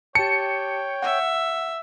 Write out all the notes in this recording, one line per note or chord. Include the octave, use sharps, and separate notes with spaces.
G4 C#5 G5 A5 C#7
E5 F#5